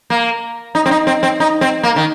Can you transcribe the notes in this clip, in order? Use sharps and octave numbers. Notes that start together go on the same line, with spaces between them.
A#3
D#4
C4
D#4
C4
C4
D#4
C4
A#3
D#3